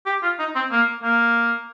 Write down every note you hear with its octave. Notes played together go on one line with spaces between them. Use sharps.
G4
F4
D#4
C4
A#3
A#3